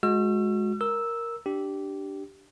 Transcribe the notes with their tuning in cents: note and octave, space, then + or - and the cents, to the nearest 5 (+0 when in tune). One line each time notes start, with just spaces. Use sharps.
G#3 +15 F#4 -25 E6 +40
A#4 +0 E6 -5
D4 +0 G4 -15